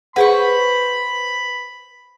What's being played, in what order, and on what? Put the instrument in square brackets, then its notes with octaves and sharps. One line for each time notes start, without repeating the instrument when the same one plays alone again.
[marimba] G#4 F#5 [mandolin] B4 C5 C#6 [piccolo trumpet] B5